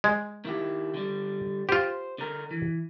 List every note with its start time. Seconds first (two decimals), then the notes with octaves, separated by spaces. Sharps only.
0.04 G#3
0.45 D#3 E4 G4
0.94 D3 G3
1.69 F4 G4 C5
2.18 D3 A#4
2.51 E3